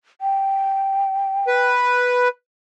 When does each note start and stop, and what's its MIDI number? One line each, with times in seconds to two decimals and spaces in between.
0.21 1.69 79
1.47 2.28 71